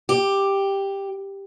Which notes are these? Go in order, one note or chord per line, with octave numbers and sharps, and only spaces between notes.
G4